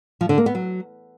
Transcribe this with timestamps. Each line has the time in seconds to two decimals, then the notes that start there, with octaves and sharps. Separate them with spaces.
0.21 F3
0.29 D3
0.38 A#3
0.46 B3
0.55 F#3